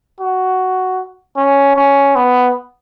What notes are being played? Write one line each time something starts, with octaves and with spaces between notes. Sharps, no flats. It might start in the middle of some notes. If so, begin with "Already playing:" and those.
F#4
C#4
C#4
B3